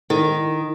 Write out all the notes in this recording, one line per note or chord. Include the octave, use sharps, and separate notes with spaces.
D#3